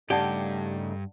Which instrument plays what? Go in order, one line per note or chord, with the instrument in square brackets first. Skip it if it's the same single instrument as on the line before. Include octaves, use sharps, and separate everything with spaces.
[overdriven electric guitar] G2 [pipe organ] C#3 A3 D#4 [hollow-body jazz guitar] G4 [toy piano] D5 F#5 A5